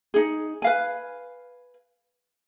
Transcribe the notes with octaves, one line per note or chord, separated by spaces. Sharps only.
D#4 G#4
B4 F5 G#5